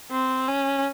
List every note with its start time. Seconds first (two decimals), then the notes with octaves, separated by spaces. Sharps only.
0.11 C4
0.48 C#4